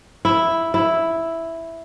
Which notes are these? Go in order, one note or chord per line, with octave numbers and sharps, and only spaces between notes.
E4
E4